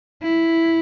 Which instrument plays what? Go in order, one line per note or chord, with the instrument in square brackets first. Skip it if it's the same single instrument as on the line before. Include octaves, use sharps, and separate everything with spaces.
[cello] E4